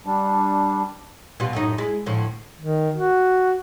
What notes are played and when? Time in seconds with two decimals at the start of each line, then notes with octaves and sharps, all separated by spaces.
0.06 G3 D4
1.40 B2 G3 F4
1.53 F#2 A2 D#4
1.78 G#3 E4
2.06 D2 A2 F3
2.60 D#3
2.96 F#4